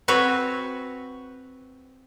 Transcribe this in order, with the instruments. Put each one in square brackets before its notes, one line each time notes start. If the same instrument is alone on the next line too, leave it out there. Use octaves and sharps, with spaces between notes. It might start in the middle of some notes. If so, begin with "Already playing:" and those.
[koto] C4 F#4 B4 C#5